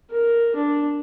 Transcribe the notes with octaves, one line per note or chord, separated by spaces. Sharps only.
A#4
D4